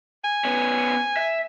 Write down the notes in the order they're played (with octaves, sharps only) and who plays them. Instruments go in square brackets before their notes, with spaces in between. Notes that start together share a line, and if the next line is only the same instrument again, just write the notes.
[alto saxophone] G#5
[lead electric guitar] B3 C#4
E5